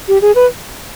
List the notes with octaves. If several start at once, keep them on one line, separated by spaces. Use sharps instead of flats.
G4
G#4
B4